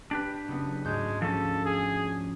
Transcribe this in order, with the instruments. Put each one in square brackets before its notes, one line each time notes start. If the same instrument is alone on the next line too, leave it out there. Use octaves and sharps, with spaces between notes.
[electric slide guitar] D4 G4 B4
[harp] F#1 B3
[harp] D2 G#2 G6 [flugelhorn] G#3
[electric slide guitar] F3 C#4 [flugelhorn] A4
[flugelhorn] G#4